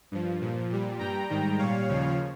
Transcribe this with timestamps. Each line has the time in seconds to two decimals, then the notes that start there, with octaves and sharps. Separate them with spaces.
0.12 G2 F3
0.41 A#2 F3
0.69 A#2 G3
0.99 G2 G3 G5 A#5
1.29 G#2 D#3 G3
1.58 A#2 G3 C#5 F5
1.89 D#2 C#3 F3